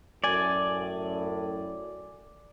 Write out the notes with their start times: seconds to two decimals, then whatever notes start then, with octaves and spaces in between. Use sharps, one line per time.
0.24 F#2 A2 D5 G#5